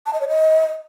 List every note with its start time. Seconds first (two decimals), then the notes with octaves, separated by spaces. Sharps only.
0.06 A5
0.13 D#5
0.21 C#5
0.28 D#5